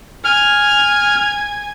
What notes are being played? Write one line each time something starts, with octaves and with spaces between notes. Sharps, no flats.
G#5 F6